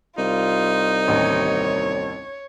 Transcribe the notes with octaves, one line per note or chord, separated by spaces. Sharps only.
C2 D#4 F4
A1 D#2 C#5